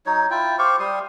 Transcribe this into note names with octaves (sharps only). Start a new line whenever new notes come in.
F#3 D#4 C#5
E4 F4 G5
G4 C5 F5 C#6
G3 C6 D#6